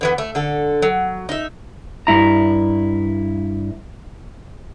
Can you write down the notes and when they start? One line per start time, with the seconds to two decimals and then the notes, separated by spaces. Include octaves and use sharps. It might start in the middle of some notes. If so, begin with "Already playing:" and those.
0.01 D3 E3 B3
0.18 A3
0.35 D3 A4
0.82 F#3
1.29 D#4 E5
2.07 G2 E4 A#5